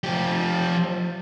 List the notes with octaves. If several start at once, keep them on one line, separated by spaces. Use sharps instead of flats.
F3 G4